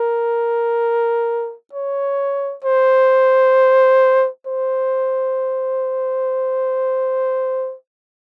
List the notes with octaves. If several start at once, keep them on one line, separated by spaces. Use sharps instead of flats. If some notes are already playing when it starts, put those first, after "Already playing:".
Already playing: A#4
C#5
C5
C5